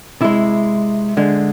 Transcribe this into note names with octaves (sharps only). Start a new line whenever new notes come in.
C3 G#3 E4
D3 G#3